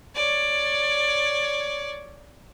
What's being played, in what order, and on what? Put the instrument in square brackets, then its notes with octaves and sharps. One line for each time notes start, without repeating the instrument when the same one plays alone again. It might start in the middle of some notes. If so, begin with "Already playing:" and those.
[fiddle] C#5 D5